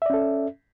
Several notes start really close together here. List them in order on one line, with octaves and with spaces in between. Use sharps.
E5 D5 C#4 A4